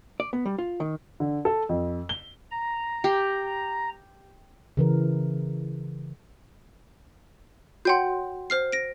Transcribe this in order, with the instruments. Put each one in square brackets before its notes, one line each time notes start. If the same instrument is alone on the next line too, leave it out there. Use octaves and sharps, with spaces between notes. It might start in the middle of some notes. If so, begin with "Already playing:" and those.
[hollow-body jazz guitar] D5
B3
G3
F4
D#3
[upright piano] D3
A4
F2
G7
[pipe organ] A#5
[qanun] G4
[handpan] C#3 E3 A#4
[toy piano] F#4 C#5 C6 [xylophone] F#5 G5 G6
[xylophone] C5 F6 C7
A#6 D7